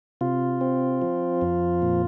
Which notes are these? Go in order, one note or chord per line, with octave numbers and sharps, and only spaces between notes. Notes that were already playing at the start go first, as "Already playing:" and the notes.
C3 F4
C4
F3
F2
A#2